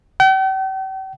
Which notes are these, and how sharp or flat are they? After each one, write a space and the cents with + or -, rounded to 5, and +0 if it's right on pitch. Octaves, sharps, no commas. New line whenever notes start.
G5 -45